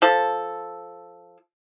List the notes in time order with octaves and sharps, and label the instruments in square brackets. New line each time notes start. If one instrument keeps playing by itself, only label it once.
[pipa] F3 A4